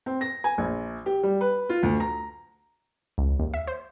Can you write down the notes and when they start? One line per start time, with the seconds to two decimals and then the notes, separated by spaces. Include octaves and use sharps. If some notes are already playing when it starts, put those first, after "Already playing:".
0.06 C4
0.21 A#6
0.44 G#5
0.58 A#1
1.06 G4
1.23 G3
1.41 B4
1.69 F4
1.83 D2
2.00 A#5
3.18 C#2
3.40 D#2
3.54 E5
3.67 C5